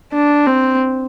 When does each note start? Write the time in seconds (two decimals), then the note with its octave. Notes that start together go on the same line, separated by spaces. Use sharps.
0.12 D4
0.47 C4